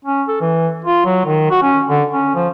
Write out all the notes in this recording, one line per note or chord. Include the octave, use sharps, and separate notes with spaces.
C#4
A4
E3
F4
F#3
D#3
F#4
C#4
D3
C#4
F3